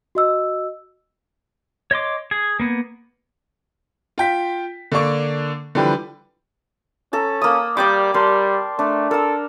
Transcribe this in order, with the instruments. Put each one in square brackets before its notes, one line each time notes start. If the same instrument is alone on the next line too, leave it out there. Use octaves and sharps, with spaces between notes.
[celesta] F#4 D#5 E6
[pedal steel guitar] C#5 D#5 C6 D6
G#4
A#3 B3
[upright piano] F4 G5 B6
D3 A#3 D4 C#6
D3 E3 F3 G3 G4 B4
[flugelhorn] C#4 [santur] A4 A#5
[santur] A#3 D#6
[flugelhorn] G3 [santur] D5 G5 D6
[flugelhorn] G3 [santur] A#4 A5 C6
[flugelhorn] A3 [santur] D4
[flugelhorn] A4 [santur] A#4 E6